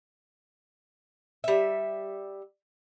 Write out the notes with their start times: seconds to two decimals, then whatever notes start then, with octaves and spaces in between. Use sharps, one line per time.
1.44 G3 E5